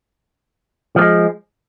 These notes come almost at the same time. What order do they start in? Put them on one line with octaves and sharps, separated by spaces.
F3 A3 G#3